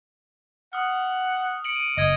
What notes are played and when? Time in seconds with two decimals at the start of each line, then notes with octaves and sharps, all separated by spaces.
0.73 F#5 D#6 F6
1.64 C#7 D7 F#7
1.76 D7 D#7
1.97 F#1 D#5 D#6 G#6 D#7